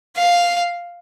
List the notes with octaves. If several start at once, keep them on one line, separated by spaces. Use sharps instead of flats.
F5